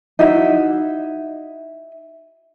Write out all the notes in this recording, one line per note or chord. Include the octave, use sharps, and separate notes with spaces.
D#4 E4 F#4 E5